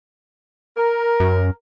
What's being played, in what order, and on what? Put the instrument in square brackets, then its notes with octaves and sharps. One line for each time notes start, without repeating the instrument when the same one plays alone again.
[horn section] A#4
[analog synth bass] F#2